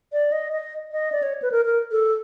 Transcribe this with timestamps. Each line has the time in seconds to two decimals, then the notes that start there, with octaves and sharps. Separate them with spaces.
0.13 D5
0.32 D#5
0.52 D#5
0.92 D#5
1.12 D5
1.23 C#5
1.42 B4
1.52 A#4
1.65 A#4
1.91 A4